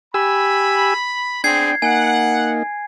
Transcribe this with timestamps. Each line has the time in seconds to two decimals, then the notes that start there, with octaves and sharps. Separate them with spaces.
0.14 G4 G#5 B5 E6
1.44 B3 C4 D4 G#4 G5 G#6 C7
1.82 A#3 D#4 F#5 G#5